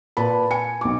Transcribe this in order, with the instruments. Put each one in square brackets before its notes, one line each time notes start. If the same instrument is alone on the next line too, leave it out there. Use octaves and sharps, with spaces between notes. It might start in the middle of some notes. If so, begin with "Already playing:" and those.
[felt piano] A#2 B4 A5 B5
G#5 C#7
B1 D6